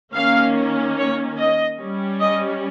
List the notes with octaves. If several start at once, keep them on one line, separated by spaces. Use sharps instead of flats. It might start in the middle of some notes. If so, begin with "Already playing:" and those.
D#3 A#3 C#4 F5
C#5
D#5
G3 C#4
D#5